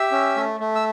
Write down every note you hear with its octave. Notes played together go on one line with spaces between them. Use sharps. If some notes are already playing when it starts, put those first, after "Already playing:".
Already playing: G4 E5 E6
C#4
A3
A3
E6